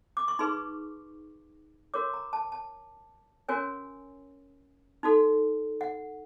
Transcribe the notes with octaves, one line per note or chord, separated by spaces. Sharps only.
D6
C#6
D#4 G#4 B4 C6
F#4 A#4 C#5 D6
A#5
A5
A5
C#4 F#4 A#4 C#5 G#5
D#4 F#4 A4
F#5